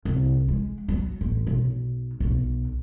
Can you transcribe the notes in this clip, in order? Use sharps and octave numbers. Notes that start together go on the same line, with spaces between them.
C2
G#3
F#3
A1
B1
B1